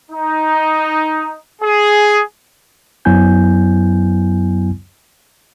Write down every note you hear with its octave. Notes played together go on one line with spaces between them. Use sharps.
D#4
G#4
F#2 F#3 B3 E4 G#5 G6